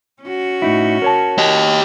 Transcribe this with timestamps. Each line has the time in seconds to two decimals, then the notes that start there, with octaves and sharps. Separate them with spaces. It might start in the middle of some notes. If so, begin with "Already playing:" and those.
0.23 C#4 F#4
0.62 A2 D#4 E4
1.02 A#4 C#5 A5
1.38 G4 D#5